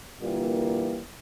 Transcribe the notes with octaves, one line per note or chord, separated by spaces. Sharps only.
A#2 D3 E3 G3 A#3